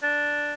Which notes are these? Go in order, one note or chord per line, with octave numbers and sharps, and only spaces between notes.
D4